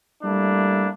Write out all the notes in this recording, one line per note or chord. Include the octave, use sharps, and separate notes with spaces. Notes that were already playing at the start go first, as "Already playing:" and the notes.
G3 A3 A#3 D4 E4